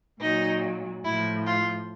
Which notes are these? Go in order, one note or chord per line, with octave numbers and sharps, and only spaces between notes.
A#2 F#3 D#4
A2 F3 E4
F4